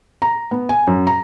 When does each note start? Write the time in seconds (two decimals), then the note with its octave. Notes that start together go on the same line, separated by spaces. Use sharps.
0.22 A#5
0.51 B3
0.69 G#5
0.87 F#2
1.07 A#5